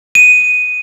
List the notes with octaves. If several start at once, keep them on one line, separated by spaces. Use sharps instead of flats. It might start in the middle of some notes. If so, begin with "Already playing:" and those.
D#7